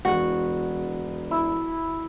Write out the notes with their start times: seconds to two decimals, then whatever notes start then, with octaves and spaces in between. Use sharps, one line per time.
0.05 E1 F#4
1.31 E4